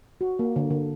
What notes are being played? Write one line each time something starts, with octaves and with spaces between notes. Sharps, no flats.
F#4
A#3
D3
D3